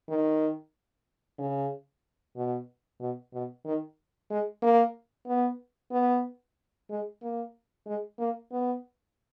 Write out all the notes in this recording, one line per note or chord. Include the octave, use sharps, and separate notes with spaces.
D#3
C#3
B2
B2
B2
D#3
G#3
A#3
B3
B3
G#3
A#3
G#3
A#3
B3